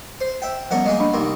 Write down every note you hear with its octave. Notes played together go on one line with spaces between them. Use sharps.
C5
E5 G5
F3 G3 B3 C#4 A#4 F#5
G#3 A#3 G#4 D#5
D4 D#5 B5
C2 A#3 D#4 C6